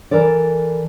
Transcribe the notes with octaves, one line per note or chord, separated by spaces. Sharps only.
E3 A4 A#4 D5